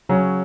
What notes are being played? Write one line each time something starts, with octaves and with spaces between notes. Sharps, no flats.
C#3 F#3 C#4